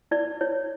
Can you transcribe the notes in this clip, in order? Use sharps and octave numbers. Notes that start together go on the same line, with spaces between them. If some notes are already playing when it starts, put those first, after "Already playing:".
E4 D5
E4 C#5